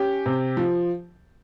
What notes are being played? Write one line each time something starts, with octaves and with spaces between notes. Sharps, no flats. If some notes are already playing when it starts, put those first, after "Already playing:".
Already playing: C#4 G4
C3
F3